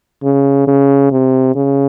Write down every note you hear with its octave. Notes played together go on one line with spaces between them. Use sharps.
C#3
C#3
C3
C#3